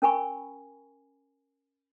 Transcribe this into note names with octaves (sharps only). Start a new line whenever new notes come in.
C#4 A#4 G#5 B5 C#6